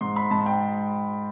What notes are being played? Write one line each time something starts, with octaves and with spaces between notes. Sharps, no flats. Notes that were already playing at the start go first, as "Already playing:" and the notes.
G#2 C6
B5
G#2 A5
G5